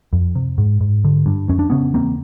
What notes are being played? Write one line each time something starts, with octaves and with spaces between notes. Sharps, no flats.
F2
C3
G#2
G#2
D3
G2
F2 C#4
D4
C#3 B3 C#4
E2 A#3 C4